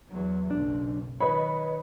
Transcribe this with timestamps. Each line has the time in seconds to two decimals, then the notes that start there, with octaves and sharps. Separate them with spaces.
0.10 E2 F#3
0.51 F#1 B1 D4
1.20 D#3 B4 C#5 D#5 B5